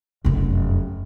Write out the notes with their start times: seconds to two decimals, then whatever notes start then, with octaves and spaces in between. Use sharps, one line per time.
0.25 F1 F#2